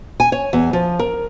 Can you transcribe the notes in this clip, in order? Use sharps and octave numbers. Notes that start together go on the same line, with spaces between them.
G#5
C#5
E2
F3
A#4